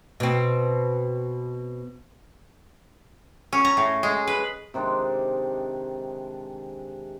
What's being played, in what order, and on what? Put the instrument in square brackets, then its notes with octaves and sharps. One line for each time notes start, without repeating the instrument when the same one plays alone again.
[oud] B2 C4
[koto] C#4
A#5
A2
G#3
B4
[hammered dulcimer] C3 D#3 G#3 D4